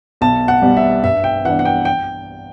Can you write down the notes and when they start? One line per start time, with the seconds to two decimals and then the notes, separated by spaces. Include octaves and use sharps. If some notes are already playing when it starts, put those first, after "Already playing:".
0.21 B1 A5
0.48 F#5
0.62 B2 G3
0.77 E5
1.03 G2 E5
1.24 G5
1.45 E3 B3 D4 F#5
1.59 F#5
1.65 G5
1.85 G5